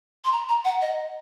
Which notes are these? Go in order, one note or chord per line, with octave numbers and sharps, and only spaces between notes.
C6
A#5
A#5
F#5
D#5